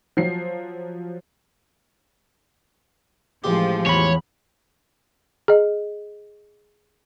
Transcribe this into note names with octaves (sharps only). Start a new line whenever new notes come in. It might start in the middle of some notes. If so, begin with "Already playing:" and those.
F3 F#3 F4 C7
A1 F3 G#3 G4
E2 C#5 B5
G#4 D#5